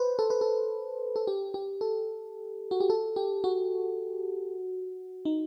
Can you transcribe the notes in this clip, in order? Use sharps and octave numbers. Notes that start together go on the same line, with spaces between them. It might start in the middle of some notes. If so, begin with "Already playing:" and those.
Already playing: B4 C5
A4
B4
A4
A4
G4
G4
A4
F#4
G4
A4
G4
F#4
D#4